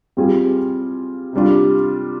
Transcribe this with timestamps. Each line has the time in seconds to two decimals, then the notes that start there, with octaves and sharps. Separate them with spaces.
0.17 G3 C4 F4 G#4
1.33 C3 G3 D4 F4